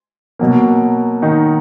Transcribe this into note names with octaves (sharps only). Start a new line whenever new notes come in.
B2 F#3 A#3
D#3 D#4